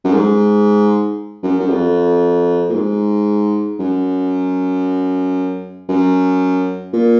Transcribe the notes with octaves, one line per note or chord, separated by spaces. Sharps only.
F#2
G#2
F#2
F#2
F2
A#2
G#2
F#2
F#2
A#2